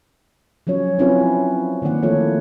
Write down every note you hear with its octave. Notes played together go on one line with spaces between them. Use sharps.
F3 F#3 C#4 C#5
C4 C#4 E4 F4 B4 C5
D3 D#3 A#3 D5 F#5
F3 A3 E4 F4 A4 C#5